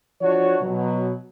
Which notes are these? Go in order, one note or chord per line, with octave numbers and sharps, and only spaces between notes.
F3 D4 F#4 C#5
B2 F#3